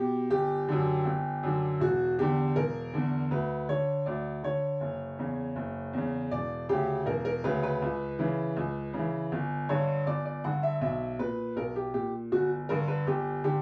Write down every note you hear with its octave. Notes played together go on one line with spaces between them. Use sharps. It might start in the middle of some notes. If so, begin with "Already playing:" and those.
Already playing: B2 G4
G1 G4
F#2 D3
G1
F#2 D3
E1 F#4
E2 D3 G4
E1 A#4
E2 D3
D2 B4
D3 C#5
D2 D5
D3 C#5
F#1
E2 C#3
F#1
E2 C#3
E1 D5
D2 C#3 G4
E1 A#4
A#4
D2 C#3 B4
B4
C#2
C#3 E3
C#2
C#3 E3
G1
G2 D3 C#5
G1 D5
D5
G2 D3 F#5
E5
B1 E5
A#2 B4
B1 A#4
G4
A#2 G4
G1 F#4
G2 D3 A#4
B4
G1 G4
D3 G4